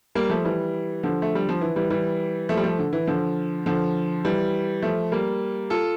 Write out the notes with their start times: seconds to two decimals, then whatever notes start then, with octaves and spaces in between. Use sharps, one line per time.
0.15 G3 A#3
0.30 F3 A3
0.45 E3 G3
1.03 D3 F3
1.22 A3
1.35 G3
1.49 F3
1.61 E3
1.76 E3 G3
1.90 E3 G3
2.49 F3 A3
2.57 G3
2.63 F3 A3
2.79 D3
2.93 E3
3.07 D3 F3
3.66 D3 F3
4.25 E3 G3
4.82 F3 A3
5.12 G3 A#3
5.70 F4 A4